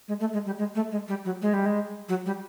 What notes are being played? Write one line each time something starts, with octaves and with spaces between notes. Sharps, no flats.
G#3
A3
G#3
G3
G#3
A3
G#3
G3
F#3
G#3
G3
G#3
F#3
G3